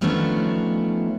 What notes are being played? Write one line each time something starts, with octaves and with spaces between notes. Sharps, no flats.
D#3 F3 A3 B3 C#4 D4